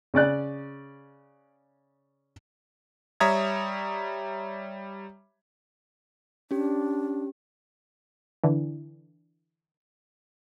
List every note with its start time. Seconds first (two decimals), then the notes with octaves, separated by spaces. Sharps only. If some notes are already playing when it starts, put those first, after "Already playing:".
0.14 C#3 C#4 D5 F#6
3.20 G3 C#5 E5 A#5 D#6 G#6
6.51 C#4 D4 G4
8.44 D3 E3